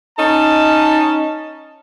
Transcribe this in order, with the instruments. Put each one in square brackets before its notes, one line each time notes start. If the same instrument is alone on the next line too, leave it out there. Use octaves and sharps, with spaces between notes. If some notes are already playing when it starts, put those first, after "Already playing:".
[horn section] C#4 A5 [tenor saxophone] D#4